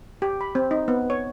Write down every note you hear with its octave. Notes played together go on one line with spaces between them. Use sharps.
G4
B5
C4
D#4
B3
C#5